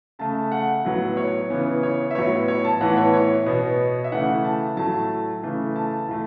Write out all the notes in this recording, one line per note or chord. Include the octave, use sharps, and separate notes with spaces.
C#3 A3 A5
F#5
A2 F#3 B3
C#5
C#3 E3 B3
C#5
E5
A2 F#3 B3 C#5
C#5
A5
A2 E3 B3 F#5
C#5
C#5
B2 B3
E5
C#3 E3 A3 F#5
A5
A2 F#3 A3 A5
C#3 E3 A3
A5
A2 A3